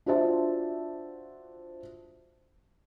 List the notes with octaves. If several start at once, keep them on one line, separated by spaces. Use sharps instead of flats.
D4 F4 F#4 C5 E5 A5